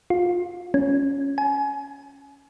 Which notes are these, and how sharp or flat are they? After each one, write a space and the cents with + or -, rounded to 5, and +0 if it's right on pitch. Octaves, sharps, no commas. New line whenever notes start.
F4 +25
C#4 +5
G#5 +30